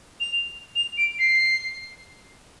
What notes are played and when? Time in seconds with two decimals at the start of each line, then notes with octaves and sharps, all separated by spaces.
0.20 F7
0.76 F7
0.98 D7
1.19 C7